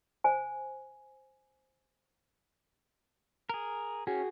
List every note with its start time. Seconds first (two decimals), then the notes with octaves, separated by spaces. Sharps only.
0.24 C5 G#5
3.49 G#4 A#4
4.07 C#4 F#4 G#4